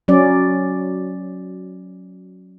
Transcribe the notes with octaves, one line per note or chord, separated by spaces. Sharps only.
F#3 C#4 D5